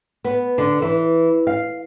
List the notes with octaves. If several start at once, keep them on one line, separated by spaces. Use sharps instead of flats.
B3
D3
E3
F5